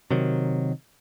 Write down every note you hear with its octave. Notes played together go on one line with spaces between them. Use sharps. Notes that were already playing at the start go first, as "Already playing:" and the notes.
C3 D#3 F#3